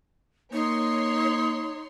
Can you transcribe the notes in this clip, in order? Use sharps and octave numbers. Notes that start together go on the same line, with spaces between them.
A#3 D#4 C#5 C6